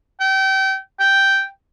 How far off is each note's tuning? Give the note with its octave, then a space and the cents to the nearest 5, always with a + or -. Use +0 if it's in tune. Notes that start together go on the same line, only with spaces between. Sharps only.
G5 -30
G5 -5